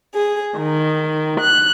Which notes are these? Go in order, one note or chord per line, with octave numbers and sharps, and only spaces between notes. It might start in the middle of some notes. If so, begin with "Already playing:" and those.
G#4
D#3
F#6